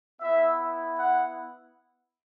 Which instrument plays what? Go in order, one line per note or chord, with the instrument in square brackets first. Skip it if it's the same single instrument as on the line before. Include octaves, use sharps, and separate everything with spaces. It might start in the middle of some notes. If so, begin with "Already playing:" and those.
[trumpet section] B3 E4 E5
F#5